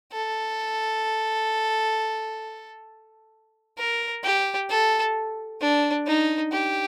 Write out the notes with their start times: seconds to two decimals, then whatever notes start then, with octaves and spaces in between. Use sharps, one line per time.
0.12 A4
3.78 A#4
4.24 G4
4.69 A4
5.60 D4
6.07 D#4
6.52 G4